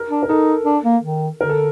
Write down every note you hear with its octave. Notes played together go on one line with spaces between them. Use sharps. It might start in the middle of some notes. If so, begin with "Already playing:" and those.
Already playing: A#4
D4
A#4
D#4 A4
D4
A#3
D#3
D3 A#4
A4